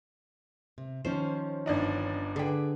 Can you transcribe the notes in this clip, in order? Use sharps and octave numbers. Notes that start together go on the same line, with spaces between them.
C3
D#3 F3 C#4 C5
G1 D4 D#4
D3 G#4 B4 G5